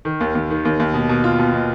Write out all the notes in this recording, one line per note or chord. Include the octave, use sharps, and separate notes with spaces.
D#3
D#2
D#2
D#3
D#2
D#2
B2
B2
F4
B2
B2